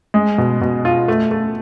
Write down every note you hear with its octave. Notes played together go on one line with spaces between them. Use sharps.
G#3
B2
B2
F4
A3
A3